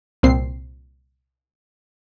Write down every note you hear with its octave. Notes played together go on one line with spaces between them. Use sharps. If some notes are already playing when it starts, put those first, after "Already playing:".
C2 A#2 C4 C7